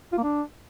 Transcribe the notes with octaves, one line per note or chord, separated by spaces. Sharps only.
F4
A#3
D4